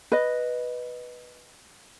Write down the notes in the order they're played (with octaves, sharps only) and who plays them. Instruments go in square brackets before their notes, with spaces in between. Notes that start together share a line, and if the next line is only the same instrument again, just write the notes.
[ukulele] B4 D#5